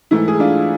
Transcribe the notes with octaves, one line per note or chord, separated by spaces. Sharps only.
G#2 E3 A3 E4
G#4
D4 F4